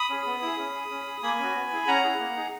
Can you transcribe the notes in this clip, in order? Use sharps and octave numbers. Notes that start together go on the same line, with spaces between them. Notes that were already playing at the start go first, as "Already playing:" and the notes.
Already playing: B5 D#6
C#4 G#4
B3
E4 G#4
C#4
G#4
C#4
G#4
A#3 G#5 B5
C#4 F#4
B3
E4 G#4
C#4 F#5 A#5
E4 G#4
A#3
D#4 G#4